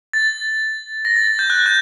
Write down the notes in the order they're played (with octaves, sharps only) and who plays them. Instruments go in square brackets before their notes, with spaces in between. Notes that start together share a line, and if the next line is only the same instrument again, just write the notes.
[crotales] A6
A#6
A6
A6
G6
F#6
G6